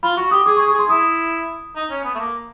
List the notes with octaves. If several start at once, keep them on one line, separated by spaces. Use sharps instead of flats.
F4 B5
F#4 C#6
G4 D#6
G#4 D6
C#6
G#4
C#6
G#4 C6
E4 D#6
D#4
C#4
B3
A3
A#3